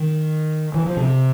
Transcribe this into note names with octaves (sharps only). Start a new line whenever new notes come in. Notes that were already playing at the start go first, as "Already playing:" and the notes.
Already playing: D#3
E3
F3
C3